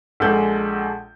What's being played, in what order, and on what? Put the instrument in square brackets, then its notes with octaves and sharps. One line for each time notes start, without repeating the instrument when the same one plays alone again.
[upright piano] A#1 G#3 A4 F#5 A5 G6